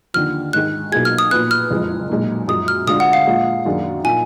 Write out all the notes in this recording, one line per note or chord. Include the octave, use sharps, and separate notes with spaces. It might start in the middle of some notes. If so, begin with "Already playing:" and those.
D#2 D3 F3 F6
G#2 D#3 G#3 F#6
B1 B2 A#3 F4 G#4 G#6
F6
D#6
A#2 F3 B3 F#6
F6
F#1 F2 F3 G#3
B1 A#2 G#3
F#2 F3 G#3 D#6
F6
D2 D3 G#3 D4 F4 D#6
F#5
F5
A#2 F3 G#3
F#2 D#3 A#3 D4 G#4
A#2 F3 A#3 D#4 G#5